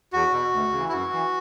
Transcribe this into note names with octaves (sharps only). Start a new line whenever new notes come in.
E2 F#4
B2
D2
C#3 E3
E4
F#2 F#4
E3